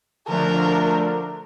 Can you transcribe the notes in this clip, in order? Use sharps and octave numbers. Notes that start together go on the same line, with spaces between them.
D3 F3 A3 D4 A#4